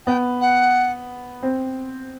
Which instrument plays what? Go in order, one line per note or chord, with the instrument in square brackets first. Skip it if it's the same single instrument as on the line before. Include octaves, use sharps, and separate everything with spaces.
[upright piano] B3 [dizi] G5
[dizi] F#5
[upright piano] C4